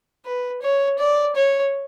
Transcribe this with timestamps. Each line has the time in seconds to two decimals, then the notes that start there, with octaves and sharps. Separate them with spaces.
0.25 B4
0.62 C#5
0.99 D5
1.36 C#5